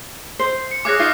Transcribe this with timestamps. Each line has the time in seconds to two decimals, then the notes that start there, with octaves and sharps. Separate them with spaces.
0.39 C5
0.71 C#7
0.85 G#4 C#5 F5 D6 F#6 A#6
0.99 D#4 F4 F5